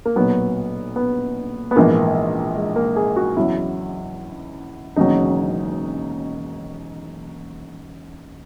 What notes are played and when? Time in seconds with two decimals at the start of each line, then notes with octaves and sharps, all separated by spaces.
0.05 A#3
0.16 B1 A#2 F#3 B3
0.96 B3
1.71 B3
1.76 A#1 G#2 E3 A#3
2.57 G#3
2.76 A#3
2.96 G#4
3.16 F#4
3.37 E2 C#3 F#3 E4
4.96 E1 D#2 C#3 F#3 D#4